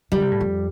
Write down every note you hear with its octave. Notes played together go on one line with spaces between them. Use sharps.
D3 G3
C3
A2
F2